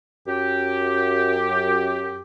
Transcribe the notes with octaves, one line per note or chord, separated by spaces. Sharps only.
F#2 G4